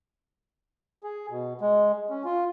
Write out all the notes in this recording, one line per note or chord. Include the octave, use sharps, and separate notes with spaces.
G#4
B2
G#3
C#4
F4